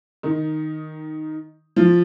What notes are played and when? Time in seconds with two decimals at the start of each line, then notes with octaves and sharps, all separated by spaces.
0.23 D#3 D#4
1.76 F3 F4